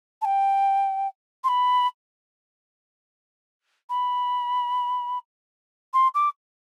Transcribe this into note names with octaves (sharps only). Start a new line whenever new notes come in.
A5
G5
C6
B5
B5
C6
D6